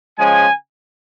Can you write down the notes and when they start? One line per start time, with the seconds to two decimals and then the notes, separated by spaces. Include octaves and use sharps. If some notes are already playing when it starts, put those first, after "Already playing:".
0.19 C#3 F3 G#3 G#5